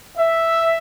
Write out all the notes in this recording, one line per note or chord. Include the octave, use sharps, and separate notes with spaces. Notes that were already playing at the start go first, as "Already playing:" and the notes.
E5